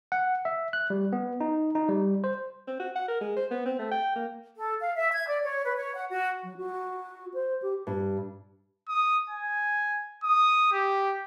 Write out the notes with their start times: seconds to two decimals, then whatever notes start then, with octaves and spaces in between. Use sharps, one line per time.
0.12 F#5
0.45 E5
0.73 F#6
0.90 G3
1.13 B3
1.41 D#4
1.75 D#4
1.89 G3
2.24 C5
2.67 C4
2.80 F#4
2.95 F#5
3.08 A#4
3.21 G#3
3.36 C5
3.51 B3
3.66 C4
3.79 A3
3.91 G5
4.16 A#3
4.56 A4
4.81 F5
4.96 E5
5.13 G#6
5.28 D5
5.43 C#5
5.65 B4
5.76 C#5
5.95 F#5
6.10 F#4
6.44 F#3
6.57 F#4
7.34 C5
7.62 G4
7.87 G2
8.89 D#6
9.30 G#5
10.23 D#6
10.72 G4